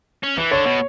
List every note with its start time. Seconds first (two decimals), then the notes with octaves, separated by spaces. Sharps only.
0.23 C#4
0.37 E3
0.51 D3 C#5
0.65 B2